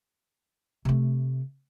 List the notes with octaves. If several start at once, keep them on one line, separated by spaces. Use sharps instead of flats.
C3 A3